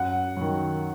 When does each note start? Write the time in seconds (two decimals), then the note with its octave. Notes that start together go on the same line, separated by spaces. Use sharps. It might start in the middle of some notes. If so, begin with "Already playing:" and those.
Already playing: F#2 F#5
0.37 D#3 F#3